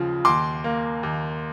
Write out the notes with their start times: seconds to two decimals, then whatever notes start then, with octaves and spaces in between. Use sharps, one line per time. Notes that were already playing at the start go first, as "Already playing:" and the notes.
Already playing: D#2 C#3 F3
0.25 D#2 C6 D6
0.64 A#3
1.03 D#2